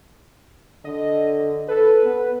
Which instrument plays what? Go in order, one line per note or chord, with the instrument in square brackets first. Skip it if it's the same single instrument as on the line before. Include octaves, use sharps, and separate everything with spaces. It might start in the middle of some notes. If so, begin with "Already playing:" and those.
[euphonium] D3 [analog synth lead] D#5
[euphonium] A4 [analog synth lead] B4
[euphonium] B3